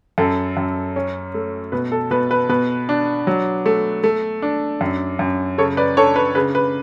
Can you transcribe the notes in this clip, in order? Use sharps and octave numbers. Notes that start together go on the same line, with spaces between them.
F#2 A4
F#2
C#4
A3
B2 B4
A4
B2 B4
B4
B2 B4
D4
F#3
A3
A3
D4
F#2
F#2
C#3 A4 C#5
B4 D5
D4 A4 C#5
B4
C#3 B4
B4